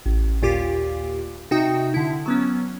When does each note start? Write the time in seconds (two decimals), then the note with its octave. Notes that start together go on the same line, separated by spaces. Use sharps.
0.06 A1
0.42 D#2 A#2 F4 G4 D6
1.51 C3 D#4 F#4 G5 D#6
1.94 D3 E4
2.26 F#3 B3 C#4